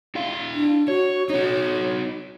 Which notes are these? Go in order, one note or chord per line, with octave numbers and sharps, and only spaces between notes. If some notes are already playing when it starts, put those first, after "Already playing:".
E4 F5
D4
F#4 C#5
D#4 F#4 C#5